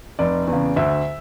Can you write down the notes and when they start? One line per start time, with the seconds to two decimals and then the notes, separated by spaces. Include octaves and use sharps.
0.19 F1 D5
0.47 E2
0.53 C#3
0.76 D2 E5